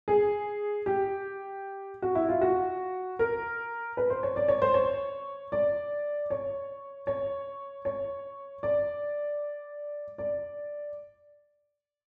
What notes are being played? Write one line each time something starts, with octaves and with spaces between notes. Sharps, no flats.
G#4
G4
F#4
E4
F4
F#4
A#4
B4
C5
C#5
D5
C#5
C5
C#5
D5
C#5
C#5
C#5
D5
D5